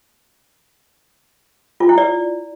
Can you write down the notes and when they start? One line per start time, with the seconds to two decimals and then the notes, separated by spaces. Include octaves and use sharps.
1.80 F4
1.89 E4
1.98 D5